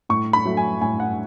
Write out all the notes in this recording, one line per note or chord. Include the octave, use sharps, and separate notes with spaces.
A2 C#6
B5
F#3 A3
G#5
A2 G#5
F#5